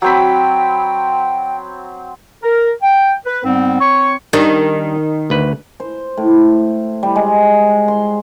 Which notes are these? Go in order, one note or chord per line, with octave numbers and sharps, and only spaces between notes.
F#3 C4 G5 B5
A#4
G5
B4
G#2 G3 B3 C4
C4 C#5 C#6
D#3 G3 D4 D#5
D2 B4
C5
A2
G3
G#3
C6